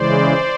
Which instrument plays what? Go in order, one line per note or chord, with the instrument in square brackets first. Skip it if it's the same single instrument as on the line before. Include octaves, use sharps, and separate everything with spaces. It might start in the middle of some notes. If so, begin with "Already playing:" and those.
Already playing: [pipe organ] C#3 E3 G#3 C5 D5